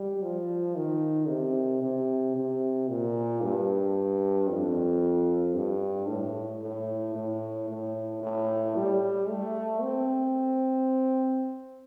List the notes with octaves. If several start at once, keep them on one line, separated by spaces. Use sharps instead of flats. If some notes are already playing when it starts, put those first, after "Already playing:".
Already playing: G3
F3
D#3
C3
C3
C3
A#2
G2
F2
G2
A2
A2
A2
A2
A2
G3
A3
C4